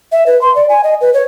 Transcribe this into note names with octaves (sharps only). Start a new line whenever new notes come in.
E5
B4
C6
D5
G#5
D#5
B4
C#5